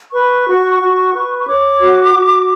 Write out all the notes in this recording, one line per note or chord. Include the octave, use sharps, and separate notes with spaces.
B4 C#6
F#4
F#4
B4
C#6
C#5 D6
F#4
F#4